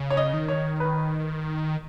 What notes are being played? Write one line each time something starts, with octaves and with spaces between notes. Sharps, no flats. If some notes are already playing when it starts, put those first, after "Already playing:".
Already playing: C#3
C#5
D#5
D#3
C#5
B4